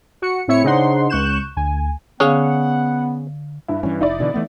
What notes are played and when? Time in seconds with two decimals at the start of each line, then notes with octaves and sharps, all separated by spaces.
0.22 F#4 C#7
0.48 A2 C4 E4 C#5 E5 C#7
0.64 C#3 D4 D#4 C5 F#5 C6
1.10 C#2 C#6 F#6 G6 E7
1.56 D2 G#5
2.20 D3 B3 C#4 G#4 F5 F#5
3.68 G2 E4
3.83 G2 E3 C#4
4.01 F1 D#4 E4 D5
4.20 B2 D3 E3
4.34 E3 A3 B3